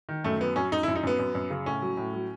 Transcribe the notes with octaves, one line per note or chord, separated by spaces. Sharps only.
D#3
F#2 A3
F#3 B3
F#2 C#4
F#2 D#4
E4
F#2
D#4
F#2 B3
F#2
F#2
C#3
A2 C#4
F#3
A2
F#3